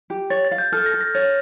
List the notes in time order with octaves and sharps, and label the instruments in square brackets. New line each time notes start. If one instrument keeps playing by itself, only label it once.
[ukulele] G4
[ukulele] C#5 [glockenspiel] A6
[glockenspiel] A6
[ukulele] F5
[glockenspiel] G6
[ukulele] A4 [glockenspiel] F6
[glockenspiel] A#6
[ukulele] A4
[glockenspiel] A#6
[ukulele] C#5 [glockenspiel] A6